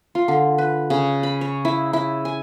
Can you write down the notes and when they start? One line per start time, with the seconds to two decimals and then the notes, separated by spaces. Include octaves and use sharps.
0.15 F4
0.28 D3
0.58 B4
0.90 C#3
1.23 B5
1.41 C#5
1.65 E4
1.93 E4
2.25 G#5